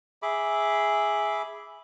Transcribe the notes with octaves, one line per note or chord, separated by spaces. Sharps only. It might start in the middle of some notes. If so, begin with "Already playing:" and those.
G#4 E5 B5 D6